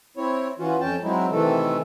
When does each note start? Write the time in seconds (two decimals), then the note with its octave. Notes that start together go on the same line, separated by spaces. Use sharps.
0.17 C4 E4 C#5
0.59 E3 C#4 F4 F#4
0.81 F2 C#4 G5 A5
1.03 F#3 G#3 C4 D#4 E4
1.31 C3 D#3 E3 A3 A4